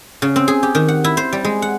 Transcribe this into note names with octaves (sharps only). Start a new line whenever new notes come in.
C#3
C4
G#4
G4
D#3
F#5
E4
C5
G3
G#3
F#5